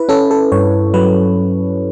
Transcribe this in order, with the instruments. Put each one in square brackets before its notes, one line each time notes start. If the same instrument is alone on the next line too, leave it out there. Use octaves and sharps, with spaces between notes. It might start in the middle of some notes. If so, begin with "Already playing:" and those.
Already playing: [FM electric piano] E4 B4
C#4 A4
A4
G2 C#5
F#3 B4